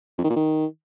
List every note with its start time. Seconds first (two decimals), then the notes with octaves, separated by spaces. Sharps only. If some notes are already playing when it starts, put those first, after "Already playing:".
0.18 F2
0.24 D#3
0.30 A#2
0.36 D#3